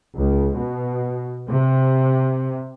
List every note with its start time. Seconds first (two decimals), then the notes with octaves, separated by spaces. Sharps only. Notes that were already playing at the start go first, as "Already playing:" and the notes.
0.17 C#2
0.56 B2
1.48 C3